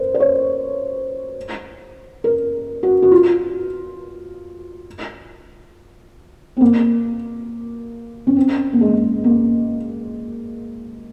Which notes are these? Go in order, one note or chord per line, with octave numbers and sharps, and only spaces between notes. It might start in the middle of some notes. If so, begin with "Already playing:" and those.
Already playing: A#4 C5
C5
C#5
A#4
F#4
F#4
F4
C4
A#3
C#4
C4
A#3
G#3
A#3